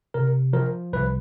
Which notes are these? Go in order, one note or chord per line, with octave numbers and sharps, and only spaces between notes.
C3 A#4
F3 A#4
C2 B4